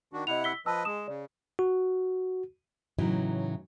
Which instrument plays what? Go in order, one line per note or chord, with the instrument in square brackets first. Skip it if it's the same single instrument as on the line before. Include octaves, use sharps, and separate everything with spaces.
[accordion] D#3 D4 F#4
[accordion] C3 E4 F#5 [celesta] D#5 F7
[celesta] E6 B6 G7
[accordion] F3 B4 D#5 [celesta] A5 E6
[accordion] G#3 [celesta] D#6 E7
[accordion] C#3 [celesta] D5
[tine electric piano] F#4
[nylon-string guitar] A2 C#3 E3 F#3 D#4